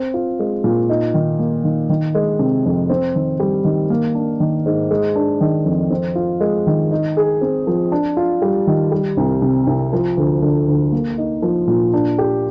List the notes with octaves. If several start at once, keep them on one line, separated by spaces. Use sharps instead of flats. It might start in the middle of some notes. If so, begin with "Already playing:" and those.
Already playing: C4
F4
G#3
A#2
D#4
D#3
A#3
D#3
D#3
G#3
C3
F2
C4
D#3
G3
D#3
A#3
D4
D#3
G#2
G#3
D4
D#3
F2
C4
F4
G#3
D#3
D#4
G#4
C4
F3
D4
F4
G3
D#3
G3
C2
C3
C2
F3
D2
D3
D2
A#3
D#4
F3
A#2
D4
G4